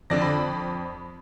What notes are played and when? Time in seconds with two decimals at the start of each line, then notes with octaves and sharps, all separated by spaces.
0.10 F2 D3 D5 A#6
0.22 B5